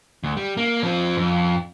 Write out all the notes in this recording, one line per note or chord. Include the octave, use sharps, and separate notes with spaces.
D2
G3
A#3
F3 C4
F2